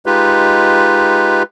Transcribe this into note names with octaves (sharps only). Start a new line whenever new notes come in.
G#3 D#4 F4 G4 B4